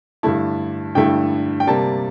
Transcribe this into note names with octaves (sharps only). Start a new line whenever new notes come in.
G2 D3 A3 E4 A5
G2 D3 A3 E4 G5
G5
C3 G3 A#3 A5